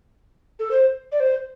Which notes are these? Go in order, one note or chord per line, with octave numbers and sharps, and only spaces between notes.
A4
C5
D5
C5